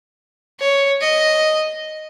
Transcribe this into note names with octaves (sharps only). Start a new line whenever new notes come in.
C#5
D#5